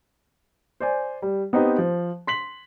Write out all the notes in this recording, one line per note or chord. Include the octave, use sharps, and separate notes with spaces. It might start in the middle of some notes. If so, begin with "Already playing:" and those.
C5 D5 G#5
G3
B3 C4 D#4 G4
F3
C6 B6 F#7